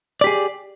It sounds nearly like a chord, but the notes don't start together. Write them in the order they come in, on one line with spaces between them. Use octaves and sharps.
D5 G4 G#4